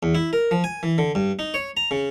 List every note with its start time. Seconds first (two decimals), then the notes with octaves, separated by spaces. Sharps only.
0.03 E2
0.15 E4
0.33 A#4
0.51 F3
0.64 G#5
0.83 E3
0.98 D3
1.15 G2
1.39 D#4
1.54 C#5
1.77 A#5
1.91 C#3